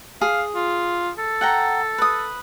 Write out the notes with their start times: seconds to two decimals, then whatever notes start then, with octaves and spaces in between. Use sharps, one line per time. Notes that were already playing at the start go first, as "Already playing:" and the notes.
0.21 G#4 F5
0.56 F4
1.18 A4
1.41 F#5 G5 A#5
1.98 B4 D#6